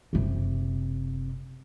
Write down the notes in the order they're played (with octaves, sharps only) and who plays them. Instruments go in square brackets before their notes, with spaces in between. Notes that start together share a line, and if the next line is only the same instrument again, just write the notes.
[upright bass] F#1 C3